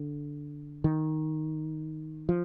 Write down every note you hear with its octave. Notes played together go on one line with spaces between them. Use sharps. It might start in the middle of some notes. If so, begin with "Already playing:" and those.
Already playing: D3
D#3
F3